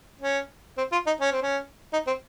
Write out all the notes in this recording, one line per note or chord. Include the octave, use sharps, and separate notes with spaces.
C#4
C4
F4
D#4
C#4
C4
C#4
D#4
C4